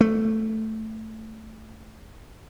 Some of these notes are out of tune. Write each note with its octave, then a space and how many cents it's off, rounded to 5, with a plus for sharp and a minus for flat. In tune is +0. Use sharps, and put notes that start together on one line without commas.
A3 +0